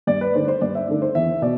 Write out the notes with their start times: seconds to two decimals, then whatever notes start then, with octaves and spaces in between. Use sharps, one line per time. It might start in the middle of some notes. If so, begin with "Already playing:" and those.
0.07 G2 D5
0.21 B4
0.35 D3 A3 D4 A4 C5
0.48 C5
0.61 G2 D5
0.75 E5
0.88 D3 A3 D4 A4
1.02 C5
1.15 E2 E5
1.42 B2 D5